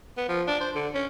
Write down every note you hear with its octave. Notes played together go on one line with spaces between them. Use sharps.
B3
F3
D4
C5
D3
C#4